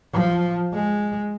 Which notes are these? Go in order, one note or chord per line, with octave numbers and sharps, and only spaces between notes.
F3
G#3